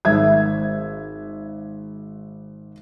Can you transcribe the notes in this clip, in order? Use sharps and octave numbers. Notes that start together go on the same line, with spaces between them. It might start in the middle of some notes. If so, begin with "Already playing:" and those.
G#1 E5 G#6